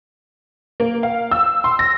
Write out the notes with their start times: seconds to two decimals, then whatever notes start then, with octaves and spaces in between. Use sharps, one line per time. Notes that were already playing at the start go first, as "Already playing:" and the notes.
0.80 A#3
1.03 F5
1.31 E6
1.64 C6
1.79 A#6